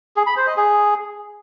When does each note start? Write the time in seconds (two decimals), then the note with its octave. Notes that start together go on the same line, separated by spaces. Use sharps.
0.16 G#4
0.27 B5
0.37 C5
0.47 D#5
0.57 G#4